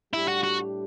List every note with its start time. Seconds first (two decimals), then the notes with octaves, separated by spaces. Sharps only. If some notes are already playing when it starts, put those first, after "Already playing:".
0.13 A2 G3 D4 E4 G4
0.28 F#4
0.43 F#4